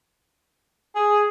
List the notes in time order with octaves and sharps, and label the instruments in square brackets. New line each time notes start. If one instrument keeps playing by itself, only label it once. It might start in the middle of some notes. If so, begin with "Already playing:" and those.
[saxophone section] G#4